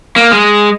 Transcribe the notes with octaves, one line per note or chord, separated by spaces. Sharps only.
A#3
G#3